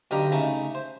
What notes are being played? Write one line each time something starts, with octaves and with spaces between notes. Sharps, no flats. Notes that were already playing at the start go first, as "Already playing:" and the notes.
B1 D3 G4 D#5 F5 A#5
C#3 A3 D#4 E4
C5